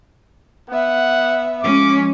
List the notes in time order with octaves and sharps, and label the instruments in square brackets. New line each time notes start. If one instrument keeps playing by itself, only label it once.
[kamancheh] B3 E5 [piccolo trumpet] F#5
[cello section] F3 G#3 C#4 [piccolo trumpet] D6